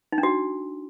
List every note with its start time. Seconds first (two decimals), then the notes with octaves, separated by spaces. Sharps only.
0.12 D#4
0.18 D4
0.23 F#4